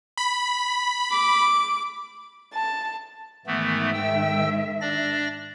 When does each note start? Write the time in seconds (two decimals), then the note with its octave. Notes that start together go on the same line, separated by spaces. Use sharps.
0.17 B5
1.12 D6
2.54 A5
3.47 G#2 D#3 E3 A3 B3 E5
3.94 G5 E6
4.81 D4 D5 A#6